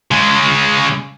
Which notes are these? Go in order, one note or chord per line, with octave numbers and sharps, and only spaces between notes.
C#3 G#3